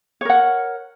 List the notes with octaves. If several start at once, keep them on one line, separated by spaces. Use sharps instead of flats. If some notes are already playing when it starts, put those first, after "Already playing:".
A#4 C#5 F#5